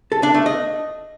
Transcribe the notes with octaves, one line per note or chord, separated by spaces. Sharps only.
A4
D4
A3
D#5